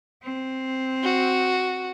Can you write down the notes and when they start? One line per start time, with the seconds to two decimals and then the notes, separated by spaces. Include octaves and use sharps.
0.24 C4
1.03 F#4